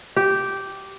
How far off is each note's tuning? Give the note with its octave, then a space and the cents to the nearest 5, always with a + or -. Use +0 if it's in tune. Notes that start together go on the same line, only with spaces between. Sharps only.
G4 -10